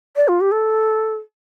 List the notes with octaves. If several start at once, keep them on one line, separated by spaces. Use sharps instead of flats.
D5
F4
G4
A4